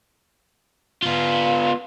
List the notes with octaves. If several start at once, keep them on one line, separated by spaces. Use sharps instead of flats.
B3 F4